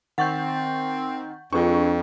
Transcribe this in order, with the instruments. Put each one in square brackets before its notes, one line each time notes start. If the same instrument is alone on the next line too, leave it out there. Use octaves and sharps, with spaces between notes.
[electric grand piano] D#3 A6 [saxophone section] C4 [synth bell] F#5 C#6 G6
[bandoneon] F2 [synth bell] D4 F4 [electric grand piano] G#4 B4 C#6